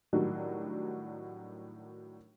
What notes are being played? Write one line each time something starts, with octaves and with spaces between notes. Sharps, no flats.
A2 D#3 F#3 G3 D4 F#4